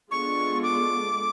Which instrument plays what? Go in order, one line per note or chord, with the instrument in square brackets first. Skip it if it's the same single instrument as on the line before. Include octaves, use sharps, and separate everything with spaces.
[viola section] G#3 B3 D4 F4 A4 [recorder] C#6
[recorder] D6